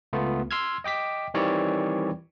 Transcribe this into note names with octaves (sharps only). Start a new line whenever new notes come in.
C#2 A3 B3 F4
C6 E6 F6 G#6
D#5 G5 D6 B6
D#3 E3 G3 C4 C#5 D5